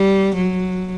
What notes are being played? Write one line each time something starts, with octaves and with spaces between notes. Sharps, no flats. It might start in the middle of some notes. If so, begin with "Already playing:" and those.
Already playing: G3
F#3